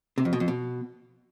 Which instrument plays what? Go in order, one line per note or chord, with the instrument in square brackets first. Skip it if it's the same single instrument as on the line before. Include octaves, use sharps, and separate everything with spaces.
[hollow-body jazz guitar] C3
F2
B2
F2
B2